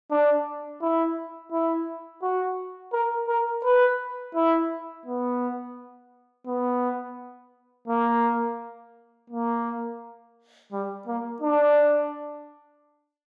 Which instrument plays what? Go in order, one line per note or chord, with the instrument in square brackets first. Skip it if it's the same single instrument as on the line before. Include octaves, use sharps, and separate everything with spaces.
[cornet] D4
E4
E4
F#4
A#4
A#4
B4
E4
B3
B3
A#3
A#3
G3
A#3
D4